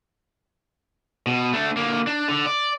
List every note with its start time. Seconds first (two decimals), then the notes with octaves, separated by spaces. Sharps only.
1.27 B2
1.53 A3 D4
1.77 D3 A#3
2.07 D4
2.28 D3
2.46 D5